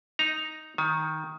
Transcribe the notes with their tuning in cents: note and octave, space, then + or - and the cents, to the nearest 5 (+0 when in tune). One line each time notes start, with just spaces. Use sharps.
D#4 +0 A#5 +0
D#3 +10 G#5 +45